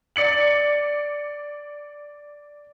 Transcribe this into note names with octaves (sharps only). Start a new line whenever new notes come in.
D5 C#7 F#7